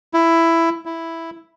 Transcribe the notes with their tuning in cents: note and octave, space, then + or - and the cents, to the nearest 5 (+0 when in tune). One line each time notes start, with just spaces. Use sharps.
E4 +10
E4 +0